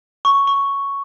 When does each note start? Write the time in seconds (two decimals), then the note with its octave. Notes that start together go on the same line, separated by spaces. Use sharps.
0.25 C#6
0.47 C#6